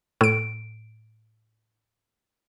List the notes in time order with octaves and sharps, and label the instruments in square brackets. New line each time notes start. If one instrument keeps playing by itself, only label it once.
[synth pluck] A2 D7